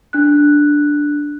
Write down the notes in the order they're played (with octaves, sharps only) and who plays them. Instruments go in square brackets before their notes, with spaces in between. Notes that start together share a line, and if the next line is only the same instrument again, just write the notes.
[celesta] D4 F#6